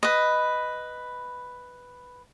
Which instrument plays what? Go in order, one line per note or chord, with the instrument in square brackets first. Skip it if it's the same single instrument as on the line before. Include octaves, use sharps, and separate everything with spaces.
[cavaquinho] B4 D#5